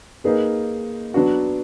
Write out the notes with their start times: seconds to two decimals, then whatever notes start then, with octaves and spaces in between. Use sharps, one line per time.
0.24 A#3 D#4 G#4 B4
1.14 F#3 B3 D4 F#4